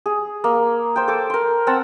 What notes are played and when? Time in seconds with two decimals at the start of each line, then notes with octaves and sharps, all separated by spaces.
0.06 G#4
0.44 A#3
0.96 C5 G5
1.08 A4 D6
1.30 A#4 C6
1.67 C4 F#5 A5 E6